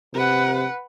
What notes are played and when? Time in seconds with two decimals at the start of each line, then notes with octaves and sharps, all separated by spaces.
0.14 C3 B4 F#5